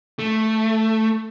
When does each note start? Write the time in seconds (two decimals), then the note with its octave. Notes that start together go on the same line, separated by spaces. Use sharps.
0.19 A3